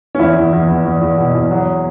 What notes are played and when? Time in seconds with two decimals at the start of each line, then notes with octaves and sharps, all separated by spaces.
0.15 C#4
0.19 E2 E4
0.37 E2
0.53 E2
0.68 E2
0.85 E2
1.01 E2
1.18 B2
1.35 E2
1.51 F#3